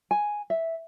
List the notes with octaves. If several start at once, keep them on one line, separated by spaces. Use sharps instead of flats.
G#5
E5